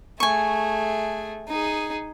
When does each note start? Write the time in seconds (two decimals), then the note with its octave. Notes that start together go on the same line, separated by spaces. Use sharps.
0.20 A3 G#4 G#5 C#6
1.48 D#4 G#4